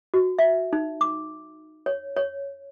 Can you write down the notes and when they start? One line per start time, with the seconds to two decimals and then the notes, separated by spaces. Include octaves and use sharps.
0.14 F#4
0.39 E5
0.73 D#4
1.01 D6
1.86 C#5
2.17 C#5